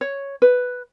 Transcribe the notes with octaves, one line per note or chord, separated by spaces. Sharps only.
C#5
B4